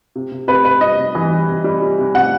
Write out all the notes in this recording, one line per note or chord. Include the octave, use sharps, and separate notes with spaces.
C3
C3
C3 B4
C3 B4
G3 D#5
C3
E3
G3
C3
G3
G3
C3
C3 F#5